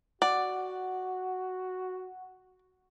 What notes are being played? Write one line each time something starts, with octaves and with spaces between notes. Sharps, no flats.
F#4 D5 F#5